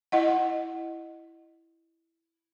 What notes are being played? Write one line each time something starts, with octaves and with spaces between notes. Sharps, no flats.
E4 D#5 F#5